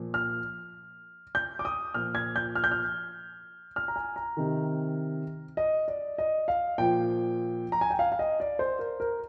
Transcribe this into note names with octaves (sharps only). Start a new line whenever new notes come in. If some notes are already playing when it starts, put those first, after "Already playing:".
Already playing: A#2 F3
F6
G6
D6
D#6
A#2 F3 F6
G#6
G6
F6
G6
F6
F6
A#5
G#5
A#5
C3 D#3
D#5
D5
D#5
F5
A#2 F3 G5
A#5
G#5
G5
F5
F5
D#5
D5
C5
A#4
A#4